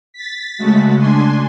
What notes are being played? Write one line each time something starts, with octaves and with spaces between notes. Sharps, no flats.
A6 B6
C#3 G#3 A3 F#4
D4 G#5 C6